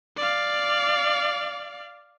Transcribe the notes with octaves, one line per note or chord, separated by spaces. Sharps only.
D5 F5